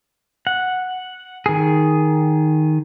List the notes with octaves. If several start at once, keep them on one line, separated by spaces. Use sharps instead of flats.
F#5
D#3 G#4